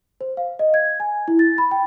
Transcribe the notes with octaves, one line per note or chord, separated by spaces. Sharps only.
C5
F5
D#5
G#6
G#5
E4
A6
B5
G5